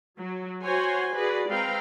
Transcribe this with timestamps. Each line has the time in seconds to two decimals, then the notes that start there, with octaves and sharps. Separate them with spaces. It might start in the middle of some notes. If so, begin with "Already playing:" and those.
0.18 F#3
0.64 F#4 C5 C#5 F#5 G#5 C6
1.14 F#4 G#4 B4 D5
1.49 G#3 C4 B4 F5 G5 A#5